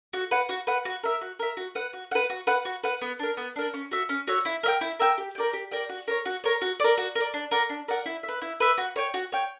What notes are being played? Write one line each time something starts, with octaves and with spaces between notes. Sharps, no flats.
F#4
B4 F#5
F#4
B4 F#5
F#4
A#4 E5
F#4
A#4 E5
F#4
B4 F#5
F#4
B4 F#5
F#4
B4 F#5
F#4
B4 F#5
B3
D4 A#4
B3
D4 A#4
C#4
F#4 C#5 E5
C#4
F#4 C#5 E5
E4
A#4 E5 G5
E4
A#4 E5 G5
G4
A#4 D5 G5
G4
A#4 D5 G5
F#4
A#4 C#5
F#4
A#4 C#5
F#4
A#4 D5
F#4
A#4 D5
D4
A#4 D5 F#5
D4
A#4 D5 F#5
E4
E5
B4
E4
B4 E5
F#4
C#5 G5
F#4
C#5 G5